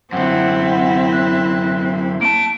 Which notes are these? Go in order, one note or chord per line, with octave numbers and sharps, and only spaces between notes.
F#2 D3 C4 E4 F#5
F#6
A#3 A5 D7